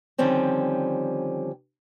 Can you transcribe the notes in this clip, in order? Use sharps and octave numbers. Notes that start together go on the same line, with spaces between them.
D3 D#3 F3 G3 C4 C#4